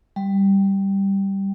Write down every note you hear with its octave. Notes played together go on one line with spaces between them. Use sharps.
G3